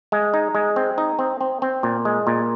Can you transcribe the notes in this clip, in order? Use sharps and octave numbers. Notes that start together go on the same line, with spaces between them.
G#3
D#4
G#3
C4
D#4
C4
C4
C4
A#2
G#3
A#2